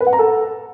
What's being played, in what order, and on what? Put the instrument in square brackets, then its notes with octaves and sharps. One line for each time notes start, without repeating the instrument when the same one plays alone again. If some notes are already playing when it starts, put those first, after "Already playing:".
[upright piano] B4
F#5
A#5
A4